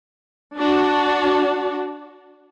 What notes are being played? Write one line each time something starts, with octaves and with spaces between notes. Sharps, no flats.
D4 F#4